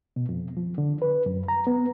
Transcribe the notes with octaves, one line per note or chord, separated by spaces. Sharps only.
B2
F2
F3
D3
B4
F#2
A#5
B3